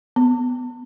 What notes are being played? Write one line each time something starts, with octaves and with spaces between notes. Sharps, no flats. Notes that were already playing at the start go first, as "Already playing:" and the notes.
B3